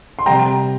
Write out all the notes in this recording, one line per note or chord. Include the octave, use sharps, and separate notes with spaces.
C6
C3 G3 G5 A#5